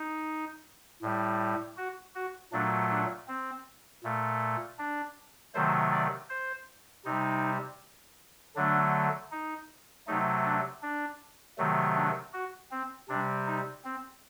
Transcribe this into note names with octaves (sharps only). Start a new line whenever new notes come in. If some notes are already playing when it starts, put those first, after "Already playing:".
Already playing: D#4
A2 G3
F#4
F#4
A#2 F#3 A3 D4
D4
C4
A#2 A3
D4
C3 D#3 F#3 A3 C5
D5
C5
C3 G3 D#4
D3 F#3 A3 D4
D#4
C3 F#3 A3 D#4
D4
D4
C3 D#3 F#3 A3
D4
F#4
C4
C3 G3 D4
D#4
C4